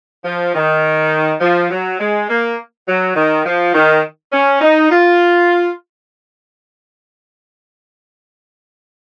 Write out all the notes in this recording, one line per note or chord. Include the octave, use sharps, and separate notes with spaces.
F3
D#3
F3
F#3
G#3
A#3
F#3
D#3
F3
D#3
C#4
D#4
F4